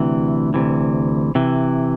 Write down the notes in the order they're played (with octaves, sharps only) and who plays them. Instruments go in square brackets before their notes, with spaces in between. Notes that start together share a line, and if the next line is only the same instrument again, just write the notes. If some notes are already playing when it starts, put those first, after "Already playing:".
Already playing: [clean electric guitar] D2 C3 E3
D2 C3 E3
C3 E3